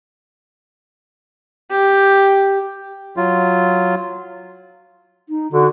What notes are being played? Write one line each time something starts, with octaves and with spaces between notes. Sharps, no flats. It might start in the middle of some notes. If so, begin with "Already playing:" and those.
G4
F#3 F4
D#4
D3 F#4